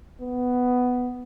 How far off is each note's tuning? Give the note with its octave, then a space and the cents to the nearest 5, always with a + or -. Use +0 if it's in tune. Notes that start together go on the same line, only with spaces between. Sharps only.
B3 +10